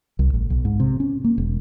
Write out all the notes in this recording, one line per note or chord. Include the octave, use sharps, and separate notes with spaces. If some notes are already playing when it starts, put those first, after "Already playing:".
C2
A1
B1
G#2
C3
C#4
A#3
E1